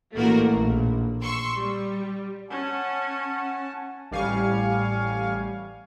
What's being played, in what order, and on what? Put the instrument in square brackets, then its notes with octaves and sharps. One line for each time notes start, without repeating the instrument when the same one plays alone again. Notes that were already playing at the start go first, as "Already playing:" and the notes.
[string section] A1 A3 A#3 F#4 A#4
A#1
C6 C#6 E6
G3
[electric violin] C#4 [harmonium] F#5 G#5 A5
[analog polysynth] A1 G3 F5 G#5 C#6